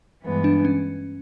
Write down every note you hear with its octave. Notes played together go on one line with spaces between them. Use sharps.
G2 E3 G#3 B3
D4
C#4